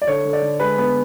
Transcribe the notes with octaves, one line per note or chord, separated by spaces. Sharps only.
D5
D3 C#5
D3
D5
D3
G#3 B4
B3